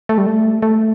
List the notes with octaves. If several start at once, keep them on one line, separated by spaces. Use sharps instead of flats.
A3
G3
A3
A3